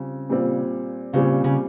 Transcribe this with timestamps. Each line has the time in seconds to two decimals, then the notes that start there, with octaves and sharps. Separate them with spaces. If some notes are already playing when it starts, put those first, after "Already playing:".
Already playing: C#3 G3 C4 F4
0.29 A#2 G3 C4 F4
1.13 A#2 C#3 G3 C4 F4
1.44 C#3